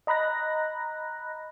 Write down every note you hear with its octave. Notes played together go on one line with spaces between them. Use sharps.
D#5 A#5 B5 F#6 A#6